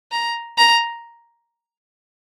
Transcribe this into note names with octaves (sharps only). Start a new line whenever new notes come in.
A#5
A#5